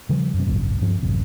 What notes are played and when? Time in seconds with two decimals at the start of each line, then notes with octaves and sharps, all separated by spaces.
0.09 C#3 F3 G3
0.34 F#2 C3
0.47 G#1 C#2 F#2 A#2
0.82 G2 F3 C4
1.03 D1 A1 F#2 C3